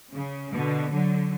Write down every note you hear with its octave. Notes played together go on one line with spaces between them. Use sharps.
C#3
B2 D3
D3 F#3